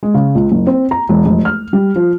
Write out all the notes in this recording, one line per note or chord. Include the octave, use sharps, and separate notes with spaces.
G#3
C#3
C#2
F#1
C4
A#5
E1
F1
F6
G3
F3